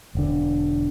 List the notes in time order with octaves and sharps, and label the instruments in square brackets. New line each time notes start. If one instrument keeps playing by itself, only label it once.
[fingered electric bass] E1 D3